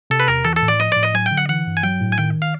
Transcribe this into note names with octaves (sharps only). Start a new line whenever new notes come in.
C3 A4
B4
E2 A#4
E3 A4
A4
A2
D5
F3 D#5
A2 D5
D#5
F#3 G#5
G5
D3
F#5
E3 F#5
G2
G#5
F#3 G5
A2
G#5
D#3 G5
F5